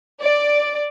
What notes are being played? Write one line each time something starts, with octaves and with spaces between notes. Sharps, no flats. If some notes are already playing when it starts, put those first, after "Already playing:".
D5